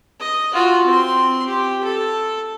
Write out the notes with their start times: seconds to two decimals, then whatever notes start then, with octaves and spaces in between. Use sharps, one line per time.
0.20 D#5
0.53 F4 F#4
0.86 C4 C6
1.46 G4
1.84 A4